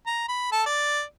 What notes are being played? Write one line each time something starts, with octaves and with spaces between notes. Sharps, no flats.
A#5
B5
A4 A5
D5